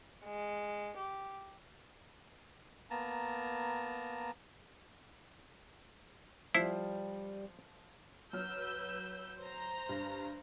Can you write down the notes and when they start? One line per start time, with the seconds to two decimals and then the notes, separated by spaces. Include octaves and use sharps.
0.24 G#3
0.96 G4
2.90 A#3 B3 A5 A#5
6.55 F3 G3 E4 C5
8.33 F#3 B4 E6 F6 G6
9.39 C5 A#5
9.89 G2